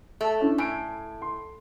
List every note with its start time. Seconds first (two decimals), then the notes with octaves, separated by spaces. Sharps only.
0.21 A3
0.41 C#4 D4 E4
0.58 A2 G#5 D7
1.22 C6